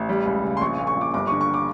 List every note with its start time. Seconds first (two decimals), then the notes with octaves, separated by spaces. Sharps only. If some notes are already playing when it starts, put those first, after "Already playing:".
Already playing: A1
0.09 G3
0.26 C#2
0.43 C#3
0.57 C6
0.61 A#1 C#6
0.75 C#6
0.79 A#2
0.87 C#6
0.97 A#1 D6
1.14 G1 D6
1.27 D3 C#6
1.41 C#6
1.54 D6